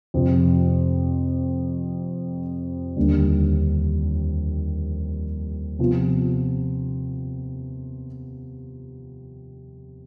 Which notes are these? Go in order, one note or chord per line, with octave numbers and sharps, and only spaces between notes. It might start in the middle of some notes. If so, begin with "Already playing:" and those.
F2 C3 F3
D#2 D3 G3
C3 F3 B3 F4